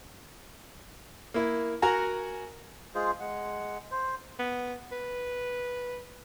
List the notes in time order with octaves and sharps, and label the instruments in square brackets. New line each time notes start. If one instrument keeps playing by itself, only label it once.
[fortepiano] A#3 E4
F#4 A#4 F#5 G#5 A#5
[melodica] G#3 F4 G#4 C5
G#3 F#5
C5
[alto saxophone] B3
B4